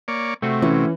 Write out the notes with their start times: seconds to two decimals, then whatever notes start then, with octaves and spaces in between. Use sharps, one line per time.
0.08 A#3 C#5 D5
0.42 C3 A3 C4 F#4
0.62 E3 C#4